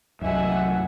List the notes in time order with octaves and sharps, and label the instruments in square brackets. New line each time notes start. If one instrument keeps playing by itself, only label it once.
[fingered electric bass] C2 F#2 [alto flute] D#5 [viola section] E5 F#5 G#5